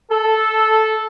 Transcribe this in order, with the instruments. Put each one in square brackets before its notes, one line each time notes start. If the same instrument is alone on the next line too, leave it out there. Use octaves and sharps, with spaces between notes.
[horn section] A4